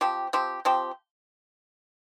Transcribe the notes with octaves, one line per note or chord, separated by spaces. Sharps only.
F3 C4 G4
F3 C4 G4
F3 C4 G4